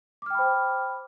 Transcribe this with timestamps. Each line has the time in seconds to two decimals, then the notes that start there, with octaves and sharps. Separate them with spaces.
0.22 D6
0.26 F6
0.30 G5
0.35 B5
0.39 C5